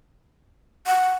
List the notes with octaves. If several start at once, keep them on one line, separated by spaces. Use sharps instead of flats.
F#5